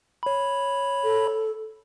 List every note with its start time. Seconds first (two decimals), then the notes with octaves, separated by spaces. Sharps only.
0.23 C#5 B5
1.04 A4